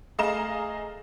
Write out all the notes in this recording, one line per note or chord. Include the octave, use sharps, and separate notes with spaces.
A3 G#4 D#5 F5 A#5 E7